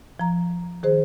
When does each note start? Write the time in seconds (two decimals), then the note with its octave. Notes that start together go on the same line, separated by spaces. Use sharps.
0.20 F3 A#5
0.83 D#3 G#4 C5